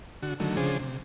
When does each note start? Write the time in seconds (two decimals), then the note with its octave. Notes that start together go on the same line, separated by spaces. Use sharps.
0.22 D3 F#4
0.40 D3 D#3 F#3 A3
0.57 C#3 F3 D4 G#4 C5
0.80 C3